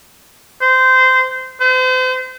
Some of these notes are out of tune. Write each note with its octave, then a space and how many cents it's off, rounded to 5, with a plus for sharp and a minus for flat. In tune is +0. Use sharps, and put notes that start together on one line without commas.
C5 -20
C5 -40